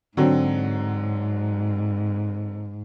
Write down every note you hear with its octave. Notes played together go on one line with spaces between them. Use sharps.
G#2 D3 F#3 C4